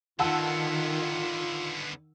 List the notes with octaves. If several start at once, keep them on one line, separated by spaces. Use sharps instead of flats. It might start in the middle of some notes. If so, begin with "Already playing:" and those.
D3 D#3 B3 F4 F#5 A5 E6